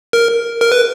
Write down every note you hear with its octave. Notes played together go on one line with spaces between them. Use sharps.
A#4
A#4
B4